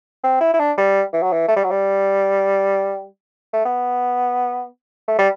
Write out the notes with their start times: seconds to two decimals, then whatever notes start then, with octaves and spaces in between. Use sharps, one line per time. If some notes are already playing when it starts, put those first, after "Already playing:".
0.24 C4
0.41 E4
0.54 E4
0.60 D4
0.78 G3
1.13 E3
1.22 F#3
1.33 E3
1.48 A3
1.56 G3
1.64 F#3
1.70 G3
3.53 A3
3.65 B3
5.08 A3
5.19 G3